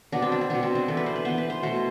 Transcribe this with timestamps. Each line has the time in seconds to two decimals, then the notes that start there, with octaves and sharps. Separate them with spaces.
0.12 B2 B3 D4
0.22 C4
0.32 D4
0.41 C4
0.50 B2 B3 D4
0.63 C4
0.75 D4
0.88 E3 B3 A4
0.97 B4
1.06 C5
1.16 B4
1.25 E3 B3 C5
1.38 B4
1.50 C5
1.63 B2 A3 C5